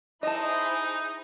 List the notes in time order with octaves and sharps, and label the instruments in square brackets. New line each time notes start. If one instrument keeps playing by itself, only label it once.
[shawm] D#4 [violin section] E4 G#4 C5 [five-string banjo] D#5 A5